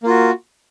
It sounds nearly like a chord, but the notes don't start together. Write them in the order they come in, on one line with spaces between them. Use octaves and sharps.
A#3 F4 F#4